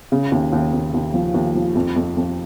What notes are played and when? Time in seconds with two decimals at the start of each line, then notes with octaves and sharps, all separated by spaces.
0.12 C#3
0.32 D#2
0.53 D#2
0.73 D#2
0.94 D#2
1.14 F3
1.34 D#2
1.55 F3
1.75 F2
1.96 F2
2.17 F2